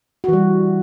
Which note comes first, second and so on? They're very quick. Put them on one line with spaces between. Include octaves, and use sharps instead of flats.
F#4 E3 G3